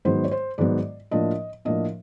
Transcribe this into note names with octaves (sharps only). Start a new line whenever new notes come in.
G#2 D#3 F#3 B3 C5
C#5
C5
G#2 D#3 F#3 B3 D5
A2 F3 A#3 D4 D#5
A2 F3 A#3 D4 D#5